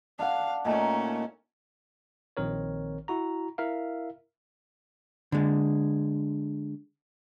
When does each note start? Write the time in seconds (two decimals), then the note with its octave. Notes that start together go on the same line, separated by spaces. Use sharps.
0.19 D4 F5 F#5
0.65 A#2 A3 C#4 D#4
2.37 A#1 D#3 C4 A#4 C#5
3.08 E4 F#4 A#5
3.58 E4 A#4 E5 F5
5.32 D3 G#3